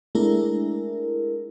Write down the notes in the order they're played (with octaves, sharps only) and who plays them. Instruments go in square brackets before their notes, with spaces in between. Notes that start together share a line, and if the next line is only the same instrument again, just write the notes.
[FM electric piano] G#3 A3 D4 E4 A#4